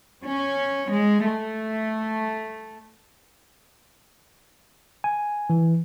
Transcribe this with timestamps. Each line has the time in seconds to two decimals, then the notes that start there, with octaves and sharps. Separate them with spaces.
0.24 C#4
0.90 G#3
1.24 A3
5.04 G#5
5.50 E3